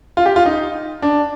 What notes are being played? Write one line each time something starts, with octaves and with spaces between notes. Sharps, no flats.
F4
G4
F4
D#4
D4